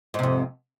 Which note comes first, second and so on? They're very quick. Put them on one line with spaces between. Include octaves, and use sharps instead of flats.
G#2 C3 F2